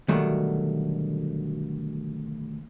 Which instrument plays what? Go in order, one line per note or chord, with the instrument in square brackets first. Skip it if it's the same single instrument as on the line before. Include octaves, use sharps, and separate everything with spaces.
[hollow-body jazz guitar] D2 B2 D#3 F#3 G3 A3